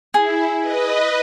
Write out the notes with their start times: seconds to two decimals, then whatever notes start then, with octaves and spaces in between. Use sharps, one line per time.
0.14 E4 G#4
0.60 B4 D#5